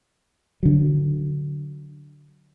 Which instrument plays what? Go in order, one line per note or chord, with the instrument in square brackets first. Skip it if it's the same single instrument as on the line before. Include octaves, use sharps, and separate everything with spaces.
[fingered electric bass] D3 F#3